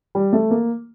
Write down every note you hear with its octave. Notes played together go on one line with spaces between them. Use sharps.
G3
A3
A#3